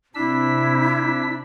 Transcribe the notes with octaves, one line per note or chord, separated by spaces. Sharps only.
C3 D4 E4 E6 B6